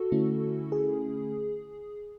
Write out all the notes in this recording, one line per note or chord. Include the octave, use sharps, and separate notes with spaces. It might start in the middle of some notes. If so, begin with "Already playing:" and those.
Already playing: F#4 A4
D3 A3 C#4 E4
G#4